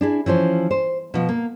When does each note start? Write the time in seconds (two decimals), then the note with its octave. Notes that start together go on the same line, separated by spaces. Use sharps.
0.01 D4 E4 G#4
0.26 E3 F3 C#4 C5
0.71 C5
1.14 B2 F3
1.29 A#3